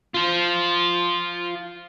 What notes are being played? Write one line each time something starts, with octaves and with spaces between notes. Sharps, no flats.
F4 C5